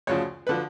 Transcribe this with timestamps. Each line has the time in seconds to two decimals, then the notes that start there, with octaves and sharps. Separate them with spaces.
0.07 D2 C#3 F3 C#5
0.47 D3 F3 B4